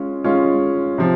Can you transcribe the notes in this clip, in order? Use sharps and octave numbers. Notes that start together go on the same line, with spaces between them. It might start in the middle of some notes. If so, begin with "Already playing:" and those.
Already playing: G#3 C#4 F4
G#3 C#4 F4
C3 F3